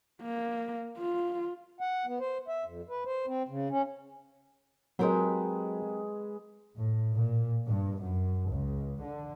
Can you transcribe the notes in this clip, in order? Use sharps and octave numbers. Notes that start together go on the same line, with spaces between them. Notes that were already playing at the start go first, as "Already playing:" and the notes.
A#3
F4
F#5
B3
C5
E5
F2
B4
C5
C4
C#3
C#4
F#3 G#3 C4 G4 A#4 B4
A2
A#2
G2
F#2
C#2
D3